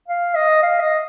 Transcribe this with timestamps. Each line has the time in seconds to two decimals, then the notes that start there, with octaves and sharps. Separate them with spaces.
0.08 F5
0.35 D#5
0.63 F5
0.80 D#5